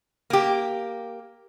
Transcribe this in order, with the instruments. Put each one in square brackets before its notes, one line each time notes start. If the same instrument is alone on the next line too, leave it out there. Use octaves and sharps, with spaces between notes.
[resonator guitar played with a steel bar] A#3 G4